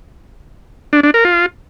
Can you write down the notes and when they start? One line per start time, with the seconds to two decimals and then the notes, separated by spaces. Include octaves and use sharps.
0.93 D4
1.03 D4
1.14 A#4
1.25 F4